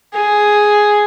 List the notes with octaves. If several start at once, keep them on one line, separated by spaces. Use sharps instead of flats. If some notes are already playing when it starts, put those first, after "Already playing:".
G#4